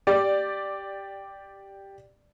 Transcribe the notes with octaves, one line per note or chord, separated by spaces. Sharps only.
G4 D5